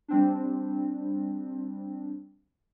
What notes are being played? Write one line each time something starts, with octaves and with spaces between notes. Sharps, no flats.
G3 C4 D4